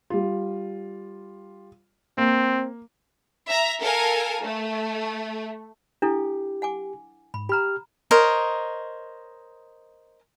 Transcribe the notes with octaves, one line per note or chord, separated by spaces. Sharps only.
G3 F4
A#3 C4
E5 A#5
A4 A#4 F5 G#5
A3
D4 E4 G4 A4
F#5 G#5 D6
G#2 B5
G4 A#5 B5 F6
A#4 C5 C#5 D#5